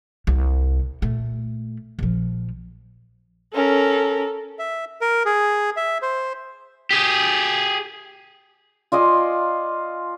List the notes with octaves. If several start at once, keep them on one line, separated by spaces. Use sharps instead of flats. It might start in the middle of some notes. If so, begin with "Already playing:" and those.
C2
A#2 A3
A#1 F3
C#4 A4 A#4
E5
A#4
G#4
E5
C5
G4 G#4
F4 D5 D#5 G#5